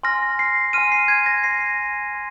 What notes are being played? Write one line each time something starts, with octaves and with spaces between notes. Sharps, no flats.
G#5 C6 F6 A#6
C7
G#5 C6 F6 D#7
C7
G#6
A#6
G#5 C6 F6 C7
G#5 C6